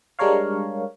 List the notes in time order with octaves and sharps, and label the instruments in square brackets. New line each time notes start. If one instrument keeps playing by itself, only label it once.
[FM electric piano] G3 G#3 D4 A#4 C#5 F5